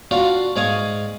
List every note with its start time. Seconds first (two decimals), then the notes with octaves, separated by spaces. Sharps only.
0.11 D4 F4 F#4 D5 F5
0.56 G#2 D5 F5 G#5 C#6 D#6